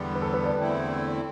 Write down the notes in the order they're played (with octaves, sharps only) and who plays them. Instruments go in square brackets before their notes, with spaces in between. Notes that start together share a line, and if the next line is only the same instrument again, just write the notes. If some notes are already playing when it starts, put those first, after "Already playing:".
Already playing: [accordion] E2 D3 G3 B3
[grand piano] B4
A4
B4
D5
[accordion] E2 D3 A3 C4 E4